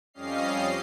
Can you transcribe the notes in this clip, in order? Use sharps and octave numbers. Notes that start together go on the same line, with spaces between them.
F2 G3 C#4 D#5 F5 C7